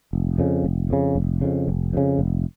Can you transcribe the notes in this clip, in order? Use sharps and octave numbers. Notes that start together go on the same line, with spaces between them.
F1
F2 C#3
F1
F2 C#3
F1
F2 C#3
F1
F2 C#3
F1